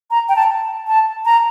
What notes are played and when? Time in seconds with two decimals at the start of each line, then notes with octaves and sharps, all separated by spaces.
0.11 A#5
0.29 G5
0.36 A5
0.87 A5
1.25 A#5